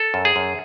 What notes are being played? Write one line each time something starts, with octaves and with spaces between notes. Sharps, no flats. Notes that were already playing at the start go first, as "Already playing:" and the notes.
Already playing: A4
F#2
G#4
F#2